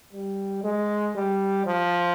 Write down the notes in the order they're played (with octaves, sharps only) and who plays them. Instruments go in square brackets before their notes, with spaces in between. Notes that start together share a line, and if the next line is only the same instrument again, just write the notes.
[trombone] G3
G#3
G3
F3